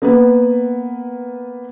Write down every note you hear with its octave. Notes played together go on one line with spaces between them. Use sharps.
A#3 B3 B4